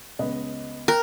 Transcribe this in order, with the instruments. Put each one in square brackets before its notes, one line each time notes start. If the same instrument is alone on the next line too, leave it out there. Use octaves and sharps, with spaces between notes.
[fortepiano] C#2 B3 D#5
[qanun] A#4 [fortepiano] G5 F#6